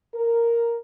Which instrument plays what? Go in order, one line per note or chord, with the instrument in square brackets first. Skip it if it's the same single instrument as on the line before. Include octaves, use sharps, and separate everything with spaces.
[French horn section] A#4